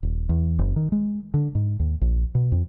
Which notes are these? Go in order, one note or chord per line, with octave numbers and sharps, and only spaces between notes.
D#1
E2
F#1
D#3
G#3
D3
G#2
D#2
A#1
B2
F2